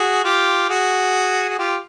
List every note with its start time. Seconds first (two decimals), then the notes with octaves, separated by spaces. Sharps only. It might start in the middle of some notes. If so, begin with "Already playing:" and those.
Already playing: F#4 G#4
0.24 F4 G4
0.69 F#4 G#4
1.49 F#4
1.59 F4 G4